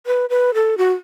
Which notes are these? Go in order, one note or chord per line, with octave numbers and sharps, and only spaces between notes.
B4
B4
A4
F#4